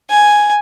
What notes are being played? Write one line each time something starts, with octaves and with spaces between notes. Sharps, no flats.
G#5